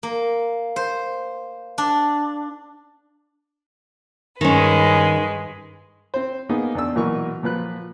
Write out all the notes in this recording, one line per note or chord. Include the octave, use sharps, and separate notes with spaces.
A#3
C5
D4
G2 D#3 G#3 C#4 B4
C4 C5
A#3 B3 D#4 G#4
E2 D4 E6
B1 A#2 E3 A#4 C#6
A#2 F3 B4 F#6